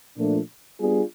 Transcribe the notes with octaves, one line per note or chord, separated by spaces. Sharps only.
A#2 F3 A3 D4
G3 B3 D4 F4 G#4